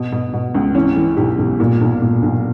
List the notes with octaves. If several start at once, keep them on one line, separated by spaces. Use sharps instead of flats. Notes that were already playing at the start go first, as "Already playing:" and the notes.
Already playing: B2
B2
B2
C#2
E3 C#4
E3
B1 G4
B1
A#2
B1
A#2
B1